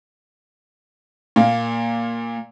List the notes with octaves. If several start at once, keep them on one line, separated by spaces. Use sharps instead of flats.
A#2 A#3